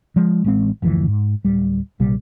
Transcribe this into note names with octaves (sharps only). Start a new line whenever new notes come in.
F3 G#3
A1 G#3 C4
F#1 D2 E3 F3
G#2
D1 G3
A#1 C3 G3